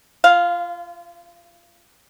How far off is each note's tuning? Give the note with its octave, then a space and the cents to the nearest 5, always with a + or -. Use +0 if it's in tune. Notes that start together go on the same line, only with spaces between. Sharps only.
F4 -25 F5 +0